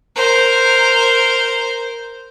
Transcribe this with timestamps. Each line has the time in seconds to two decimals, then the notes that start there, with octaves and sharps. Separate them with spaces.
0.16 A#4 C5